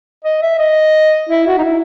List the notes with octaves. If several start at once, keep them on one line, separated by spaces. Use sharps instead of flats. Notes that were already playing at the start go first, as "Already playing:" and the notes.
D#5
E5
D#5
E4
F#4
D#4
E4